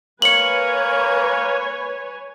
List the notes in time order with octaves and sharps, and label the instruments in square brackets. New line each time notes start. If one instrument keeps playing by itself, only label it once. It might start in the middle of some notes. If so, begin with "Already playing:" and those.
[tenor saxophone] A#3 [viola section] B4 C#5 G#5 [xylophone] C#7 F#7